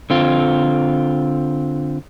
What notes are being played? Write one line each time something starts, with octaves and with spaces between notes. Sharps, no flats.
D3 C4 F4